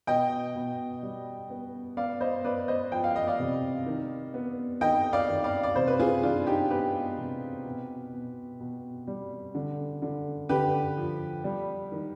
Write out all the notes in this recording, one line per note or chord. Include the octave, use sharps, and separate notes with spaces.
B2 D#5 G5
B2
G3
B3
B3 D5 F5
C5 D#5
B3 B4 D5
C5 D#5
F3 G5
F5
D#5
D5 F5
C3
D#3
B3
D#3 D#5 G5
D5 F5
D#3
D5 F5
D5
C3 C5
B4
F4 G#4
D#3 D4 F4
D#4 G4
B3 G4 B4
C3
B2
B2
B2
G3
D3
D3
D3 G4 B4
F3
G3
D#3